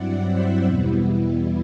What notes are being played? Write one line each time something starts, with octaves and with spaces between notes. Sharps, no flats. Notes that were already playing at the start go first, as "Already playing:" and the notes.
Already playing: G2 F#3 C4 E4 D5 F#5
C5 E5
E2 B2 G3 B3 E4